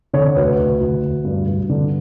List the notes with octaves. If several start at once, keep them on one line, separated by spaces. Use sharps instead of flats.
D3 C#5
D2 B4
D2
D2
D2
G2
G2
D3